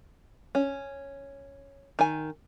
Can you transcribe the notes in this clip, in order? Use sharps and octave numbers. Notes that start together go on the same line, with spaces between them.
C#4
D#3 G#5